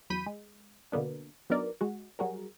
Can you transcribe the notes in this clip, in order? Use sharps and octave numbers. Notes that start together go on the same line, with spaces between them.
E2 F#3 B5 G6 B6 D#7
G#3
B2 D3 A#3 B3 D4
F#3 B3 D4 D#4 A#4 D5
G#3 F#4
F#3 G3 F#4 G#4 A#4